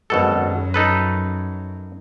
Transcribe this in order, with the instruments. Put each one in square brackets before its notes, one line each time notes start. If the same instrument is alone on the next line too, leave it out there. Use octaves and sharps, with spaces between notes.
[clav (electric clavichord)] G#1 B2 A4 [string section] F#2
[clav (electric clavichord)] D#4 A4 B4